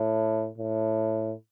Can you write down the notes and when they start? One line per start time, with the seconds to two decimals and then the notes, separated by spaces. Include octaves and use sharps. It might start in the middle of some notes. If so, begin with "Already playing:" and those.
Already playing: A2
0.58 A2